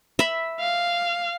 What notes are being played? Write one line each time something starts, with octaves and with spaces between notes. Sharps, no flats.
E5 B5
F5